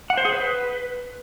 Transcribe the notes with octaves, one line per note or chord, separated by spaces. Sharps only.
F#5
C5
G#4
B4